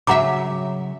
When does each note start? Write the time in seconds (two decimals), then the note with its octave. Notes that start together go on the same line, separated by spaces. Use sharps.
0.07 C#3 F#3 E5 F#5 A#5 D6